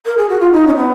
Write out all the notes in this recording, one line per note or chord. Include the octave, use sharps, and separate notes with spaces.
A#4
G#4
F#4
F4
D#4
C#4
B3